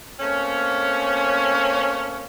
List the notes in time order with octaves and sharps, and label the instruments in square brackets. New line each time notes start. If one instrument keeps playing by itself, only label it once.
[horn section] A3 A#3 C4 C#4